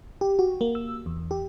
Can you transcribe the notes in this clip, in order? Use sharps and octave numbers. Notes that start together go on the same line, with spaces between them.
G4
F#4
A#3
E6
E2
G4